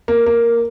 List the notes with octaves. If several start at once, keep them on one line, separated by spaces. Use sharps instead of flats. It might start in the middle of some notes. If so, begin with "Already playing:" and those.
A#3
A#3